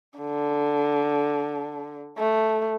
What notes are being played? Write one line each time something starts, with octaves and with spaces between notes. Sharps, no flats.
D3
A3